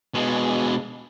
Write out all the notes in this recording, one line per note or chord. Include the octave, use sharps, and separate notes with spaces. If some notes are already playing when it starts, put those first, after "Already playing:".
B2 G#3